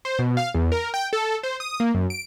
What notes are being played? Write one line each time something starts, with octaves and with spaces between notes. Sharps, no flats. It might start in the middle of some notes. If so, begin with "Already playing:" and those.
C5
B2
F5
E2
A#4
G5
A4
C5
D#6
A#3
F#2
D7